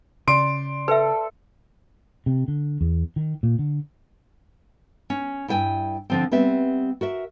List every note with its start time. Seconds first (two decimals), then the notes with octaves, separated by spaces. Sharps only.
0.28 C#3 D5 C6 D7
0.88 A4 B4 E5
2.26 C3
2.48 D3
2.81 E2
3.16 D#3
3.43 A#2
3.59 D3
5.10 C#4
5.48 G2 E4 G5 G#5
6.10 D3 F3 C4
6.31 G3 B3 C4 E5
7.01 F#4 A#4 E5